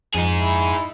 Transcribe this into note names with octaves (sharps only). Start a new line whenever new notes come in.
F2 D#4 G#4
E4